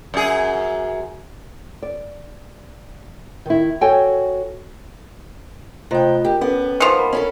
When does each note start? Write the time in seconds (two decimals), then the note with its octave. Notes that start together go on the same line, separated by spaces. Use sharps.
0.14 F#2 G#4
1.83 D5
3.46 D#3 E4
3.81 F#4 A4 C#5 G5 G#5
5.91 C3 A3 F4 D#5 G5
6.25 G4 A#4
6.41 B3 C#4 A4
6.80 D#3 F3 A#4 C#6
6.99 A#4 B5
7.13 C#4 E4 A4